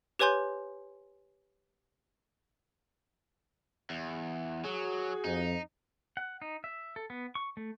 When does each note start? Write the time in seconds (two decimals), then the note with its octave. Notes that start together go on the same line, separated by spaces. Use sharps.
0.19 G4 B4 C#5 G#5 C6 G6
3.90 E2
4.65 F#3 F#4 G#4
5.25 F2 D#4
6.17 F#5
6.42 D#4
6.64 E5
6.96 A4
7.10 B3
7.35 C#6
7.57 A3